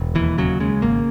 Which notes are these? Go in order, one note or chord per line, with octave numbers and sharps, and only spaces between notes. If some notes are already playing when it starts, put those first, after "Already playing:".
Already playing: E1
D#2 E3
C#3 F#3
C#3 G#3
G#1 A#3